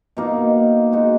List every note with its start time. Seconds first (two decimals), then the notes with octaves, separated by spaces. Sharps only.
0.17 B2 A#3 D#4
0.92 G#3 D#4 F#4